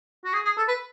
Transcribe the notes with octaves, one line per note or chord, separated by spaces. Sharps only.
F#4
G#4
G#4
A4
B4